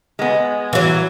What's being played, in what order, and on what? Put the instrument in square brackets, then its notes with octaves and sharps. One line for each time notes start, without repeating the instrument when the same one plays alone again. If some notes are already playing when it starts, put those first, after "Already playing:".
[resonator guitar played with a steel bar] G#3 B3
[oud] E3 F#3